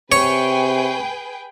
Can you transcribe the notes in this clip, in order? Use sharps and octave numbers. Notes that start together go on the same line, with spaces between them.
C3 G#4 B4 C#5 G5